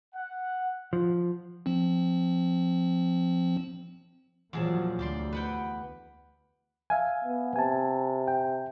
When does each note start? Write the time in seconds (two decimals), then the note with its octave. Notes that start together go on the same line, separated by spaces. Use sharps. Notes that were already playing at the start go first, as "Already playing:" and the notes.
0.14 F#5
0.93 F3
1.66 F3 C4
4.53 E2 A#2 F3 F#3 G#4 A5
4.99 D2 G4 D5 C6
5.33 B4 F#5 G5
6.90 E5 F5 G#5
7.24 B3
7.56 C3 G#5 A5
8.28 G5